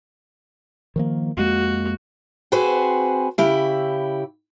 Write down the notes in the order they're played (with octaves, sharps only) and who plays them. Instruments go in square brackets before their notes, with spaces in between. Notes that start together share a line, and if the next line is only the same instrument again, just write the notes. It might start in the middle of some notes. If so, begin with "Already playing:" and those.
[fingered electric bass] D#3 F3 A#3
[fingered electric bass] F2 G#3 A#3 [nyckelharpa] F#4
[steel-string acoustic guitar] C4 F#4 G#4 B4 C5
C#3 E4 G4